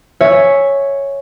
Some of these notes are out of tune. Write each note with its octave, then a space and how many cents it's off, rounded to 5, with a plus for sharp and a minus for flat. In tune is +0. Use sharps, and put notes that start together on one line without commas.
C#5 +0 E5 +0 G#5 +0